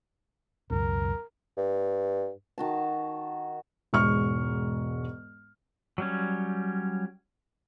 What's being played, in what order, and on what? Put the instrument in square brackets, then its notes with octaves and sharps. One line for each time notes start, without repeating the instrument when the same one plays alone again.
[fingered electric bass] C#2 F#2 B2 [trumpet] A#4
[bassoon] G2
[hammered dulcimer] D#3 F#4 A5
[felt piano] E1 G#2 C#6 F6
[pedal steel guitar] F#3 G3 C#4